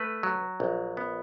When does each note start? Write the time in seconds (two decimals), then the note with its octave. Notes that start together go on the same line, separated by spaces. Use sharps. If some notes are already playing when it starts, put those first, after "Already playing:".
Already playing: A3 B4
0.23 F#3
0.60 A#1
0.97 B3